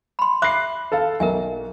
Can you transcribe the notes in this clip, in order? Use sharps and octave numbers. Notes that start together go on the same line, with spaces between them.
B5 C6
E5 B5 D6 F#6 C7
A4 F5 A5
B1 A#4 E5 G#5